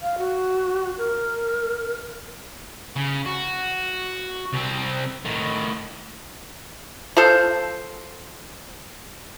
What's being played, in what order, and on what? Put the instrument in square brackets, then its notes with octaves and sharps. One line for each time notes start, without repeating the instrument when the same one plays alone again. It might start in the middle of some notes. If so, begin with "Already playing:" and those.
[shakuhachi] F5
F#4
A#4
[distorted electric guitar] C#3
F#4
C2 C4
A2 D#3
[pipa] F3 A4 C5